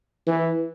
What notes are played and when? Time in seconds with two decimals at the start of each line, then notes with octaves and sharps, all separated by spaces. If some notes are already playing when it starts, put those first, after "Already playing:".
0.27 E3